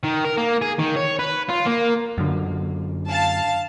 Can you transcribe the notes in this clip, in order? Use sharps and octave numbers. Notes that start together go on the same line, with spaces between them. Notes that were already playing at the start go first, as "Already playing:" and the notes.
D#3
A#4
A#3
G#4
D#3
C#5
B4
F4
A#3
F#2 D3
F5 A5